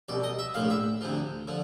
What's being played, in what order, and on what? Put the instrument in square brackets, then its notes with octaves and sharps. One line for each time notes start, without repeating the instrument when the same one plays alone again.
[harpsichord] C2 B2 D5
D#5
E5
A#1 A2 F3 F5
E5
D2 C3 F3
D3 F3